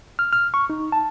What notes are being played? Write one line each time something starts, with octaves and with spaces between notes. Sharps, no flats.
F6
F6
C#6
D#4
A5